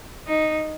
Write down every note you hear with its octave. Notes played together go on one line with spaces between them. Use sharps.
D#4